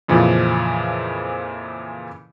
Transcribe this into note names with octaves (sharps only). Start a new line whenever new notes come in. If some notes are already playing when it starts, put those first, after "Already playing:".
F2 A#2 C#3 E3 F3